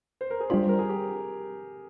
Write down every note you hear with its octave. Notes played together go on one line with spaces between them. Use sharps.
C5
A#4
G#4
G3 D4 F4 G4 C5
A#4
G#4
G4